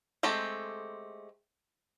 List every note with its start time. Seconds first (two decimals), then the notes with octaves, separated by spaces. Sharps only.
0.23 G#3 A3 C4 G4 A4